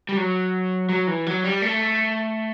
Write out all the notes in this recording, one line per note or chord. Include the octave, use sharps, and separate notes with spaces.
G3
F#3
F#3
E3
F#3
G3
A3